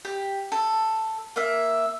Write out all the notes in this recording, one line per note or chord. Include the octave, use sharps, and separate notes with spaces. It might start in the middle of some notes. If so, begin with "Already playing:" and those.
G4
A4
A#3 E5